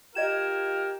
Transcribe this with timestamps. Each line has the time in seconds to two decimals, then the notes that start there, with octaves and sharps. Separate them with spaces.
0.15 F4 G4 A#4 D#5 G#6 E7